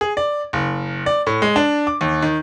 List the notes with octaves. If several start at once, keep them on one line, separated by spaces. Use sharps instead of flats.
G#4
D5
F#1
D5
A2
G#3
D4
D6
D#2
D#3